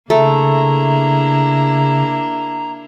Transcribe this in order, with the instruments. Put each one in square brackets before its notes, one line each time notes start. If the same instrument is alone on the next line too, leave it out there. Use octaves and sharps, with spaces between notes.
[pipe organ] C#3 [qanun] A3 [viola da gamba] A#3 D4 E4 [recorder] A#5